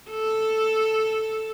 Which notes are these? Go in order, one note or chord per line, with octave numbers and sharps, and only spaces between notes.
A4